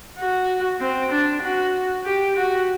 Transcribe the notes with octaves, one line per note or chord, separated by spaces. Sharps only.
F#4
C4
D4
F#4
G4
F#4